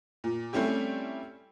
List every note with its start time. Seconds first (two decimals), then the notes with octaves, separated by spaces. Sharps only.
0.24 A#2
0.53 G3 A3 C4 C#4 E4 G4